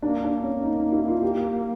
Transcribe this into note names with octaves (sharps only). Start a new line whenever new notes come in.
A#3 D4
D4
C#4
D#4
D#4
E4
F4
G4